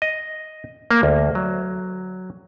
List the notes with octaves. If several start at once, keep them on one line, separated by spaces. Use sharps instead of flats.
D#5
A#3
D2
F#3